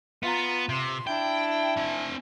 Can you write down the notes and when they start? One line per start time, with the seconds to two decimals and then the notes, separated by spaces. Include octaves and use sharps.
0.23 B3 F4 A#5
0.69 C3 C6
1.07 D4 E4 G5
1.77 C4 G#5